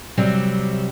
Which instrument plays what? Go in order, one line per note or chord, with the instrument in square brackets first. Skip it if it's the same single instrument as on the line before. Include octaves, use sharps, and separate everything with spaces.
[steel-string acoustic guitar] C3 F#3 G3 C4